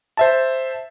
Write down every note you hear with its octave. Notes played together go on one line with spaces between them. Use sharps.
C5 E5 A5